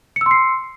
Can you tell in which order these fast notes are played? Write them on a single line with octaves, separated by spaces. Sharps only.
C#7 E6 C6 C7